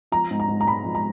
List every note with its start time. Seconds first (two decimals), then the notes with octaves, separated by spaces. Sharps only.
0.12 F3 A#5
0.31 G#2
0.40 A#5
0.48 G#2
0.61 A#5
0.66 G#3 B5
0.84 F3
0.95 A#5